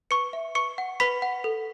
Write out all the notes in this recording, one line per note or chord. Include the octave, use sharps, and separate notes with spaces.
B4 C#6 C#7
E5
B4 C#6 C#7
F#5
B4 B5 B6
F#5
A4